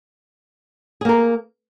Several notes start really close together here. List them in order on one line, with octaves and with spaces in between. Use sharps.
G#4 A#3 A#4